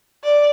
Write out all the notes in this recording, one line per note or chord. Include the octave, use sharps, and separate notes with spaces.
D5